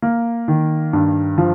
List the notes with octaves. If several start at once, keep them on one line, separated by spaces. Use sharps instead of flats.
A#3
D#3
G2
F3